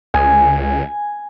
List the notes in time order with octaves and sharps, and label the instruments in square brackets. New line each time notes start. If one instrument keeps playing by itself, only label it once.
[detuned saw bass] C#2 [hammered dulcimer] G#5